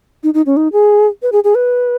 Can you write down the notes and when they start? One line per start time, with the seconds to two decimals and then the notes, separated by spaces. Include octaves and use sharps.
0.23 D#4
0.34 D#4
0.46 C#4
0.57 D#4
0.73 G#4
1.22 B4
1.32 G#4
1.44 G#4
1.55 B4